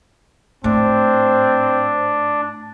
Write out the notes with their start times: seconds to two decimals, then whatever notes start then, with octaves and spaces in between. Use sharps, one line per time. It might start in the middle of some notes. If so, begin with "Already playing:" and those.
0.64 A2 C4 D4